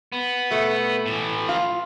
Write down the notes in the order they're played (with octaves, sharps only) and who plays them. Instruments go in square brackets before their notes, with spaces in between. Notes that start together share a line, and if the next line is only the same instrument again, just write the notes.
[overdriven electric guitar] B3
[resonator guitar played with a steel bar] B2 A3
[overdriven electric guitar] A2 E3
[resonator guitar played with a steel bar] F4